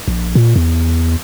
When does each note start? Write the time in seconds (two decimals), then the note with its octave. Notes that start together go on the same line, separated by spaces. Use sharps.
0.08 A#1
0.35 A#2
0.56 E2